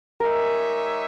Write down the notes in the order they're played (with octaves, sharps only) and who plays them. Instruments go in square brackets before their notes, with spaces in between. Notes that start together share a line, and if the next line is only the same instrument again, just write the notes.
[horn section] G#3 D#4 G4 C#5 E5 [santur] A#4